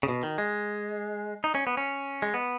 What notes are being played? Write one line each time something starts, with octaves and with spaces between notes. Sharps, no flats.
C#3
B2
D#3
G#3
D#4
C#4
B3
C#4
G#3
B3